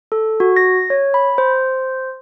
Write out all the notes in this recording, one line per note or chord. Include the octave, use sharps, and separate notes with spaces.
A4
F#4
A#6
C#5
B5
C5